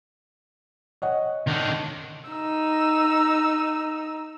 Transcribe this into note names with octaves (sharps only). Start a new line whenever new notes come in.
C#5 D#5 F#5
D#3 D4
D#4 E6